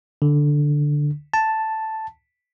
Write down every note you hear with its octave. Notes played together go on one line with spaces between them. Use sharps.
D3
A5